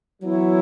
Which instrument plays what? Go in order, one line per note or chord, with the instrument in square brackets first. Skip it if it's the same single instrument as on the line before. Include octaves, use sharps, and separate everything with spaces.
[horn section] E3 B3 E4 C#5 [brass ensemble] F#3